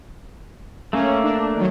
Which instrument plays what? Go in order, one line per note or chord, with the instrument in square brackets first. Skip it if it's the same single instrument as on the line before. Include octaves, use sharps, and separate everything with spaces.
[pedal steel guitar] A3 A#3 [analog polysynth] C#4
[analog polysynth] D4
D#3 F#3